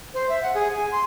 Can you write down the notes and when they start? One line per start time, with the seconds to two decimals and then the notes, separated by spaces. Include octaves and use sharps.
0.14 C5
0.29 E5
0.43 F#5
0.54 G#4
0.75 G#5
0.92 C6